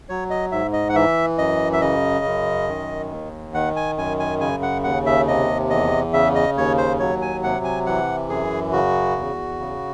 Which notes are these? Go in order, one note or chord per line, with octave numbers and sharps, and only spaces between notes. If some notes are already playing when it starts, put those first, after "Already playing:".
F#3 C#5
D#5
G#2 E5
D#5
F#5
E3 E5
F#2 D#5
E5
C#3 D#5
F#2
D#3
D#2
D#3 F#5
G#5
F#2 G#5
G#5
C#3 G#5
F#5
D#2 F#5
E5
C3 D#5
E2 D#5
C#3 E5
D#5
D#2 C#5
C5
F#3 C#5
G#5
C3 F#5
G#5
E3 F#5
F#2 G#4
C#3 F#4
E2
C#3